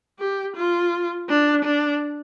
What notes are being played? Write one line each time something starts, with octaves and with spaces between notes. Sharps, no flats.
G4
F4
D4
D4